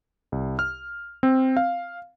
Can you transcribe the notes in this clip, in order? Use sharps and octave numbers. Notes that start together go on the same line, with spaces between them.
C2
F6
C4
F5